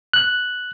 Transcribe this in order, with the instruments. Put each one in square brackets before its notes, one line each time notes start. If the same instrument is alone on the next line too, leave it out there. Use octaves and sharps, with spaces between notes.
[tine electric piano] F#6